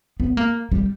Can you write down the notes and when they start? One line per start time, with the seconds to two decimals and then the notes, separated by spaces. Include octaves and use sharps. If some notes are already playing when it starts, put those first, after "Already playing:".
0.20 B3
0.37 A#3
0.72 G3